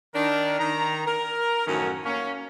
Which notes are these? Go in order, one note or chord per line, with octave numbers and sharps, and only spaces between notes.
D#3 D4 A#4
D#3 A#5
A#4
F#2 A2 D#3 F3 C#4 F#4
A#3 C#4